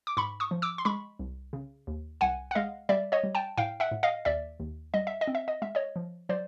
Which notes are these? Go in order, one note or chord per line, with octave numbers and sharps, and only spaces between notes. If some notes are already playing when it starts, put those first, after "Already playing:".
D6
G#2 B5 C#6
C#6 D#6
F3
D6 E6
C6
G#3 B5 C#6
C2
C#3
D#2
C2 F#5 G#5
F#5
G#3 D#5 F5
G3 D5 E5
C#5 D#5
G3
G5 A5
A2 F5 G5
E5 F#5
A2
D#5 F5
D#2 D5 E5
D#2
G3 D#5
E5
D#5
C4
E5
D#5
G#3 E5
C#5 D#5
F3
F#3 C5 D5